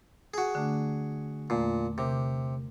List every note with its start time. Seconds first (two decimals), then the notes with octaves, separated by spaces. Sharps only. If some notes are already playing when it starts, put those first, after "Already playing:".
0.34 F#4 G#4
0.55 D3 A3 D4
1.50 E2 A#2 A3
1.98 C3 A#4 D6 G6